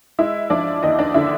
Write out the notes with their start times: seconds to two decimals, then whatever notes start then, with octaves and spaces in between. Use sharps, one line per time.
0.19 G#3 E4 E5
0.50 F3 D4 D5
0.83 D#2 D#4 D#5
0.99 D4 D5
1.14 D3 E4 E5